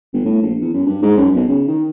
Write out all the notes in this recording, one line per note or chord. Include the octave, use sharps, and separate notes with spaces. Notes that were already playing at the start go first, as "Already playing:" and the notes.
G1
A2
A#1
E2
F#2
G2
G#2
F#2
B1
C#3
D#3